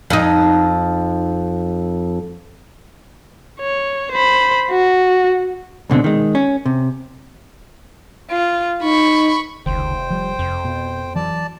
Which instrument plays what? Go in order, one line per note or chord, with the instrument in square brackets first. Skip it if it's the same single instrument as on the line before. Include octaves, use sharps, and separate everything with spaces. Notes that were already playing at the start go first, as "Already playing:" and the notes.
[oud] F2 D#4
[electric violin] C#5
C5 B5
F#4
[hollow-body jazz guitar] C#2 B2 D3 C4
D#3 G#3
C#4
C3
[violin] F4
[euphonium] D#4 [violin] B5 C#6
[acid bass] F1 [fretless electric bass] C#2 D#3 [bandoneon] C5 G5
[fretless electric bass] F3 G3
[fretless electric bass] F1 [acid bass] F2
[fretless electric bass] B2
[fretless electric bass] E3 F#3 [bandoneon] D5 A5